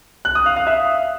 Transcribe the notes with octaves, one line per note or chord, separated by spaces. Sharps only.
F#6
D#6
F5
F5
E5